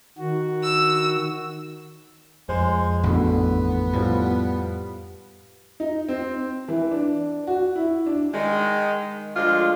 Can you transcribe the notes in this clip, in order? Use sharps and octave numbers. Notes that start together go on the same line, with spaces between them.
D#3 F#4
E6
F2 G#3 C5
A1 D#2 B2 D3 B3
A2 F3 G3
D#4
C4
E3
D4
F#4
E4
D4
D#3 G#3
D2 F3 G#3 D4 F4